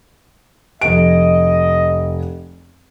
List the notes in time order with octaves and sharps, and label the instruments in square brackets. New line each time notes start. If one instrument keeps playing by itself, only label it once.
[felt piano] F1 D7 [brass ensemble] D#5